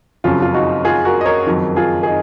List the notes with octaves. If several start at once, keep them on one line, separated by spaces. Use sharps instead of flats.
F#1 F2 C#3 F#3 F4
F4
D#4 F#4
F4 G#4
F#4 A#4
D#5
A#4 C#5
F#1 F2 D#3 F#3
F4 G#4
G#4
D#4